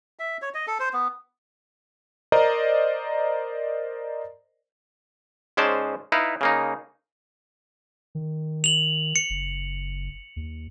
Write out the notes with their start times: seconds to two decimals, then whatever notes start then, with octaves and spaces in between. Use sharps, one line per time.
0.19 E5
0.42 C#5
0.54 D#5
0.67 A4
0.80 C5
0.93 B3
2.32 A#4 C5 D5 D#5 A#5
5.57 G#2 G#3 C#4 C5 D5 A5
6.12 D#4 E4 B4 F5
6.41 C#3 A#3 D#4
8.15 D#3
8.64 F7 F#7
9.16 C#7
9.30 F#1
10.36 D#2